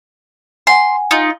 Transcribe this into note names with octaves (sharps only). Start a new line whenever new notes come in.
F#5 G#5 C6
D#4 F4